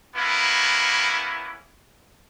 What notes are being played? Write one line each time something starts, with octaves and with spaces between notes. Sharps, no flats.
A#3 B3 C#4 E4